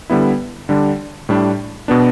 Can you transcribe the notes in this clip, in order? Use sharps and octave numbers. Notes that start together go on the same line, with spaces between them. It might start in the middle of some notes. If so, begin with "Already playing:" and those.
D3 G3 B3 E4
D3 G3 D4
A2 G3 D4
B2 B3 D4